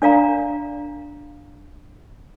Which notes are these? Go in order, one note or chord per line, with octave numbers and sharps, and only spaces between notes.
D4 D5 F5 A#5